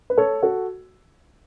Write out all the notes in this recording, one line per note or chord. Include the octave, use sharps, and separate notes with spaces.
B4
A4 C#5
F#4 A4